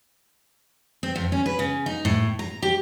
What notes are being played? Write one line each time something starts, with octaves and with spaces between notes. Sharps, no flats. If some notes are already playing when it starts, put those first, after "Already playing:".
C4
F2
C#4
B4
C#3
D#4
A2
A#5
G4